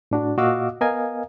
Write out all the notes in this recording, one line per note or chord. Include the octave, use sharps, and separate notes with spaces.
A2 D4 F#4
A#2 F#4 D#5 F5 D6 E6
B3 A#4 D#5 F5 G#5